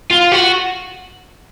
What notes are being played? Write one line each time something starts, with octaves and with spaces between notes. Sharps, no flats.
F4
F#4